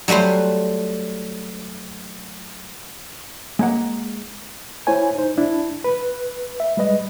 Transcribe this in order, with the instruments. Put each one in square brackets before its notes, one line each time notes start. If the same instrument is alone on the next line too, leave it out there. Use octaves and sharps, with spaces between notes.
[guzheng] F#3 G3 A3 B4 C5
[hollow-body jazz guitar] G#3 A#3 F#5
[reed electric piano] E4 C5 C#5 G#5
D#4 C5
D4 E4
B4
E5
G3 G#3 B4 D#5